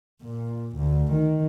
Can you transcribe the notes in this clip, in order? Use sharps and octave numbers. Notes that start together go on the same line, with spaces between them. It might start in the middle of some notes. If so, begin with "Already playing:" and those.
A#2
D2
D#3